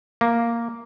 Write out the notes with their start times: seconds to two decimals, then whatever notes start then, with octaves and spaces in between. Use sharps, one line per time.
0.21 A#3